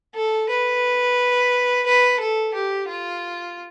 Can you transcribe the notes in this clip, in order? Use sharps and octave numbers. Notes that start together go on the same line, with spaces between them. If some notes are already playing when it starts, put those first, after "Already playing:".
A4
B4
B4
A4
G4
F4